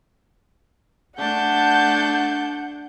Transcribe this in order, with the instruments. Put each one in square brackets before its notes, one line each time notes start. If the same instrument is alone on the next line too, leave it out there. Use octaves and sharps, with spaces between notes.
[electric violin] A3 A5 [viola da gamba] D4 [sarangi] F#5 [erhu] G6